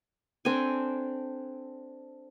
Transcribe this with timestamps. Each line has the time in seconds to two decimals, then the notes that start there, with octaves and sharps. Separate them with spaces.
0.45 C4 D4 A4 G#5